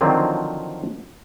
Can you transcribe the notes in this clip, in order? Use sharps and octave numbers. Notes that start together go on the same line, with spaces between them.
D3 D#3 F3 F#3 C4